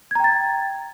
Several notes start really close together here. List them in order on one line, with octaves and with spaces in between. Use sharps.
G#6 A#5 G5 A6